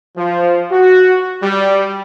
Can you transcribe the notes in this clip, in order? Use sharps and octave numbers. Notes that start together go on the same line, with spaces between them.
F3
F#4
G3